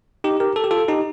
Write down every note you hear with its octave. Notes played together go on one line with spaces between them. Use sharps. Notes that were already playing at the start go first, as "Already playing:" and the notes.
D#4 G4
G4 A#4
A4
G4
F4 A4
D#4 G4